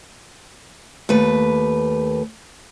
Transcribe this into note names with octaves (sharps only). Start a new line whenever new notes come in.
D#2 A3 B4